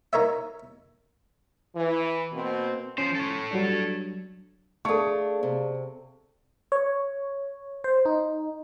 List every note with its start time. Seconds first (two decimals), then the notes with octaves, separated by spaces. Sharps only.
0.13 D#4 A#4 C#5 E5
1.75 E3
2.33 B2 A#3 C4
2.98 F3 C#4 C5
3.15 A4 C#5
3.51 F#3 G3 D4
4.85 A3 D4 G#4 A4 D5 F5 F#5 C#6
5.43 C3
6.72 C#5
7.84 C5
8.05 D#4